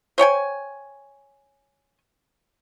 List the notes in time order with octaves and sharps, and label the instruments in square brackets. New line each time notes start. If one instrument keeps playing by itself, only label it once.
[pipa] C5 C#5 G5 G#5